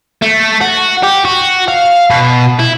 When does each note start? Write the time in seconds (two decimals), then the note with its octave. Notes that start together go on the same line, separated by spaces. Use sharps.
0.22 A3
0.61 F#4
1.03 G4
1.25 F#4
1.68 F5
2.10 B2
2.59 E4